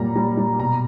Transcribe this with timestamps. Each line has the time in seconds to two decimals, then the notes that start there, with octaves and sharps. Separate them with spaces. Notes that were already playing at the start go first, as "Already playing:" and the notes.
Already playing: A#2 F#3 G3 A#5
0.16 G3
0.37 G3
0.59 B2 A#5